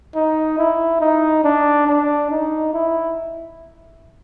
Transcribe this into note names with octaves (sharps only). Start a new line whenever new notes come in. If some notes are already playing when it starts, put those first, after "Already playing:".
D#4
E4
D#4
D4
D4
D#4
E4